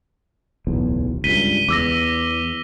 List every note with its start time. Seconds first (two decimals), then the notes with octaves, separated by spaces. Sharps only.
0.67 D1 B1 E2
1.24 C#2 G2 B6 D#7 G7
1.69 E2 D6 E6 A#6